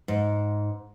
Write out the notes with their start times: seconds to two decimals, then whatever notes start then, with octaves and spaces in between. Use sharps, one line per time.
0.08 G#2